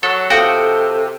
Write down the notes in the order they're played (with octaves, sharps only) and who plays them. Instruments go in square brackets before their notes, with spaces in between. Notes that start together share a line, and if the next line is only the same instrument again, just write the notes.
[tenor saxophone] F#3 [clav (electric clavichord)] A4
[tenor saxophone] C3 [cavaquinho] F4 G5 D#6 [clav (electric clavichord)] F#4 [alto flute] A4